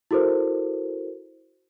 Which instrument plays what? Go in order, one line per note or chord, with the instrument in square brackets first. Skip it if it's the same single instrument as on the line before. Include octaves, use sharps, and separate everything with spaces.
[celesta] E4 F#4 A4 A#4 C5